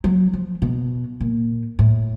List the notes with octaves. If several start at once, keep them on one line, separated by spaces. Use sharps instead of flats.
F#3
F3
B2
A#2
A2